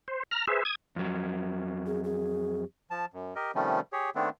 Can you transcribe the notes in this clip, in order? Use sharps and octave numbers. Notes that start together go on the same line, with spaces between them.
C5
A#5 F6
G#4 B4 C5 E5
D#6 G#6
F2 F#3
G#4
G#4
F3 A5
F#2
G4 A#4 D#5
C3 D#3 F3 G3 A3 C#4
G4 G#4 C#5
D#3 A3 B3 C4 D4